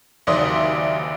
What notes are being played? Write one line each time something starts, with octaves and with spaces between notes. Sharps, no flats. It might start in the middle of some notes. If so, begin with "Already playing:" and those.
F#1 D#2 D5 E5 C6 D#6